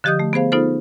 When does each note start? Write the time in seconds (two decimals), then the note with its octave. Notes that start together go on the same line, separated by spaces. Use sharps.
0.04 D3 F3 G4 D#5 D#6 G6
0.19 A3
0.33 B3 G#4 C5 F5
0.52 B3 D#4 F4 A4 C5